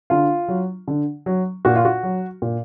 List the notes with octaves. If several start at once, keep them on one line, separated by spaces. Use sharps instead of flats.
D3 F4
F#3
D3
F#3
A#2 F#4
F4
F#4
F#3
A#2